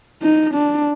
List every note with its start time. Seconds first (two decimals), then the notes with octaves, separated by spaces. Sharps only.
0.22 D#4
0.54 D4